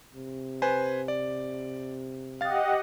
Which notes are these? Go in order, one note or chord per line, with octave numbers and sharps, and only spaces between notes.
C3
B4 C5 G#5
D5
G4 D#5 F5 F#5 A6